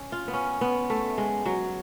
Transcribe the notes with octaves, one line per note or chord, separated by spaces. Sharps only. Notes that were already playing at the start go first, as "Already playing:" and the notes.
Already playing: C#4
F4
B3
C#4
B3
A3
G#3
F#3